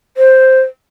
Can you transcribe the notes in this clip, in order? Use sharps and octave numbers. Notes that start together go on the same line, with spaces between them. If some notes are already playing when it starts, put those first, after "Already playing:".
C5